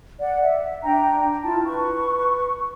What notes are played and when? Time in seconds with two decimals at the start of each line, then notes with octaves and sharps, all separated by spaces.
0.20 D5 F#5
0.42 E5
0.83 D4 G5 A#5
1.43 E4 F4 A5
1.66 B4 C#6